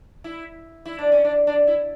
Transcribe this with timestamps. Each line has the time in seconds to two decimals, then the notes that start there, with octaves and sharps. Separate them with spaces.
0.24 E4
0.85 E4
0.99 D4
1.12 C#4
1.25 D4
1.47 D4
1.67 E4